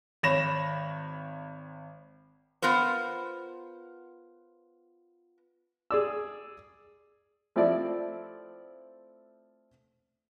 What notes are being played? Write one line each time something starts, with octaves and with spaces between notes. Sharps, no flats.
G#1 C#5 B5 A#6 E7
B3 F4 A#4 C5
G#4 D5 E6
F3 A3 C4 E4 D5